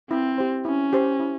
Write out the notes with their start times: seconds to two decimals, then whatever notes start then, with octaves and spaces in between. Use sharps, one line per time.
0.10 C4 E4
0.38 G4 C5
0.65 C#4 E4
0.93 G4 C5
1.20 E4